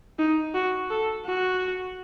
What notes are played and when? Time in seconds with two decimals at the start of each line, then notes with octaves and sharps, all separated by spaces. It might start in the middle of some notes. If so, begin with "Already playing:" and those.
0.19 D#4
0.54 F#4
0.90 A4
1.26 F#4